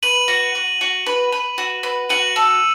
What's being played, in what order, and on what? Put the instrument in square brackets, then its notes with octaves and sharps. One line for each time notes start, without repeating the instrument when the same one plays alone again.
[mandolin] B4 [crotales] D#7 F#7
[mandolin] F#4
F#4
F#4
B4
B4
F#4
B4
[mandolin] F#4 [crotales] D#7 F#7
[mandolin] A4